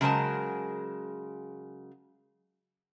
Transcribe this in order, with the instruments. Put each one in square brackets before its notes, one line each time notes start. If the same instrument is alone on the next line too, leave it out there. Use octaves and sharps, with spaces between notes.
[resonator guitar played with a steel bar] C#3 F#3 G#3 A#4 C5 A5